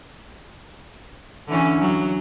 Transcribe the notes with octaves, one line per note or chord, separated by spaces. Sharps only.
D3 E3 C#4
F#3